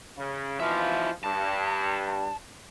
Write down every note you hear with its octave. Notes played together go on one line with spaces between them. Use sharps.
C#3
B2 E3 F3 F4 E5
G2 A5